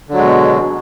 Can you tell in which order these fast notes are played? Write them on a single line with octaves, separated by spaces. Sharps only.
D3 F#3 G#3 B2